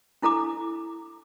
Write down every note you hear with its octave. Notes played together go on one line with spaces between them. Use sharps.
D4 E4 A4 A#5 D6